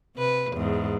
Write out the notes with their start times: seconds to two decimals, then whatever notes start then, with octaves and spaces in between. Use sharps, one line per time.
0.16 C3 B4
0.53 E2 G#2